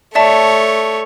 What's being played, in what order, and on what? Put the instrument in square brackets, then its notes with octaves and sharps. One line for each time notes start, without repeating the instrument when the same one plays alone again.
[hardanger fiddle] A3 C#5 [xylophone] D5 E5 A5